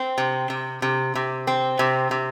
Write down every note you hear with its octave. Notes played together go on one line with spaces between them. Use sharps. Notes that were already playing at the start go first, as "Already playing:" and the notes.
Already playing: C4
C3
C3
C3
C3
C4
C3
C3